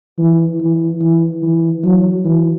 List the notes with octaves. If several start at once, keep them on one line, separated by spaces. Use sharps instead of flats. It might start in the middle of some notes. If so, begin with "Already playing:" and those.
E3
E3
E3
E3
F#3
E3